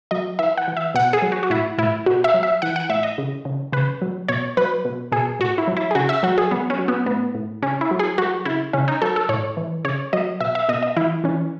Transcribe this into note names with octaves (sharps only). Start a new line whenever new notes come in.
F#3 D#5
E3 E5
F#5
E3
E5
B2 F#5
G#4
F#3
F#4
F#4
A2 E4
A2 E4
B2 F#4
E5
F#3
E5
E3 F#5
F#5
A2 E5
D#5
C#3
C#3
C#3 B4
F#3
B2 C#5
F#3 B4
B2
B2 G#4
A2 F#4
E4
F#3
E4
G#4
C#3 F#4
E5
F#3 F#4
G#4
F#3 B3
C#4
F#3
B3
A2 B3
A2
C#3 C#4
E4
F#3
G#4
F#3 F#4
C#3 E4
C#3 C#4
D#4
F#3 A4
A4
A2 C#5
E3
C#3 C#5
F#3 D#5
B2 E5
E5
B2 D#5
D#5
E3 E4
E3 C#4